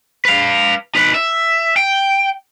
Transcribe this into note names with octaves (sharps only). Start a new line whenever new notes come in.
B4 F5
D#4 B4
E5
G5